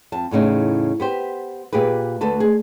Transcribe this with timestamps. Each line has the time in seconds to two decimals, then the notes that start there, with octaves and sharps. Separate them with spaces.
0.12 F2 A5
0.31 E2 A2 C#3 D#4
1.00 B3 G4 C5
1.73 A#2 G4 G#4 B4
2.21 D2 A4 B4 A5
2.40 G#4